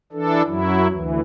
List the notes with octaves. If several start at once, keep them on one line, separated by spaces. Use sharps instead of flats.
E3 D4 A4
F#2 F#3 E4
D2 E3